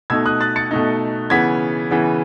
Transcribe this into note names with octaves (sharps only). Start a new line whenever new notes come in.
B2 A3 D#4 E6 G#6
D#6 F#6
F#6 A6
A6 C#7
B2 A3 D#4
C#3 E3 B3 G#6 B6
C#3 E3 B3